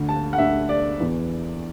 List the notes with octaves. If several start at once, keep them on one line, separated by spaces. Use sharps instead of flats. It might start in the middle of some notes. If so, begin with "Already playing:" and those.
Already playing: D2 D3
A5
F#5
D2 D3 E5
D5
E2 E3